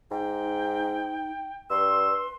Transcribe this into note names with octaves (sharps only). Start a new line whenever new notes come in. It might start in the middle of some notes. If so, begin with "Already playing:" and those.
G#2 D#4 G5
G2 B4 C6 E6